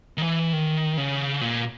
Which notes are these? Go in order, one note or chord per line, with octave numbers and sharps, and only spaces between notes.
D#3
E3
D#3
C#3
A#2